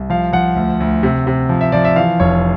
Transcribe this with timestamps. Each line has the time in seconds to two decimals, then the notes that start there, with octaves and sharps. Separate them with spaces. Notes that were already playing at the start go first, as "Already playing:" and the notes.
Already playing: C2
0.10 F3 F5
0.33 F3 F#5
0.56 D2
0.80 D2
1.03 C3
1.27 C3
1.49 F3
1.61 E5
1.72 F3 D5
1.85 E5
1.96 E3 F5
2.20 F1 C#5